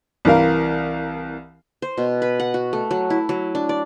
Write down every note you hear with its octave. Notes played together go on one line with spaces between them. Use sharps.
C2 E3 A#4 F5
C5
B2
B4
F#5
F#4
A3
F#3
E4
F#3
D4
D5